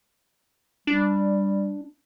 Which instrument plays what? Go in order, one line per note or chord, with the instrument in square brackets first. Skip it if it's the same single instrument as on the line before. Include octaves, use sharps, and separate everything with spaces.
[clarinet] G3 [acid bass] D4